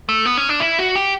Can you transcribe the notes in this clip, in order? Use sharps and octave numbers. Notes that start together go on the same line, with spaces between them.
A3
B3
C#4
D4
E4
F#4
G4